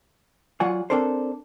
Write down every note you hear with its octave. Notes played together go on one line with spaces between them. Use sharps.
F#3 F4 D5 F#5 G#5
C4 D4 A4 A#4 C5